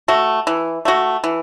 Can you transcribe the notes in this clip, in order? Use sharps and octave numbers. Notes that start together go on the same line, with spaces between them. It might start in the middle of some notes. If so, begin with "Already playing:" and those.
A3 F#4
E3
A3 F#4
E3